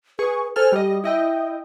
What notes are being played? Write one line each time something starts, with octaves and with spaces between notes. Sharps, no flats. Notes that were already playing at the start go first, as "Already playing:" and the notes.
G#4 B4 C#6
A4 C5 G#5 F6
G3 G4 D#5
E4 D#5 E5 G5